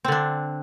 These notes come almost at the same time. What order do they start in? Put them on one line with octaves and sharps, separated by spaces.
C4 D3 D4